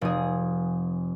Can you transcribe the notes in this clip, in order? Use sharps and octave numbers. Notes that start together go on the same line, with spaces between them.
F1 G#4